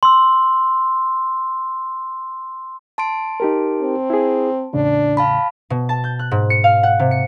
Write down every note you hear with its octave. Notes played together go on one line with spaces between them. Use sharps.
C6 E6
A5 C6 D7
D#4 G4 A#4
C4
E4 G#4
E2 A2 C#3 D4
F5 A5 B5
B2
A5
G6
F#6
G#2
C#7
F5
F#5
C3
C#7